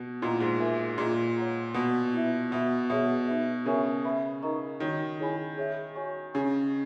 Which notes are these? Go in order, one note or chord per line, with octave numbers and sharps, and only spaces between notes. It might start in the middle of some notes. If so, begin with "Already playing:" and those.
Already playing: B2
A#2 E4 B4 D#5 F#5 A#5
G#2
F#4 A#4 E5 G#5
A#2 G#4 B4 D#5 A#5
C#5 F#5 A#5
B2 B4 F#5 B5
E4 B4 E5
B2 B4 E5 B5
B2 G#4 C#5 E5
D#4 F#4 B4 E5
C#3 A#4 C#5 E5 G#5 C#6
B4 E5 B5
D#4 A#4 D#5 A#5 C#6
D#3 D#4 F#4 C#5
E4 G#4 C#5 G#5 B5
G#4 C#5 E5
F#4 C#5 G#5 C#6
C#3 C#5 G#5 C#6